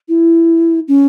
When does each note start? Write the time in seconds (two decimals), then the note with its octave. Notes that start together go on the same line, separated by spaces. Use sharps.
0.09 E4
0.88 C#4